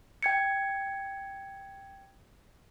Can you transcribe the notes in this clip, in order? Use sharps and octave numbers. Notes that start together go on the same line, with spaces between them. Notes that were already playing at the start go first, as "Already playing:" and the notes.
G5 G#6 C#7